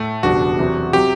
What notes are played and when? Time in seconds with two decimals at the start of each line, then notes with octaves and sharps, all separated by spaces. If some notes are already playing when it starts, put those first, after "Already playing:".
Already playing: A2 A3
0.23 F#1 E2 B2 G3 D4 F#4
0.59 E2 C3 F#3 C4
0.93 C3 F#3 C4 G4